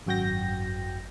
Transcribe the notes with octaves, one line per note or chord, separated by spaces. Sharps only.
G#1 F#2 F#4 G5 G6 A#6